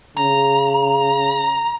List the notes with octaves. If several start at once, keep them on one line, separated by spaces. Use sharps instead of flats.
C#3 A#5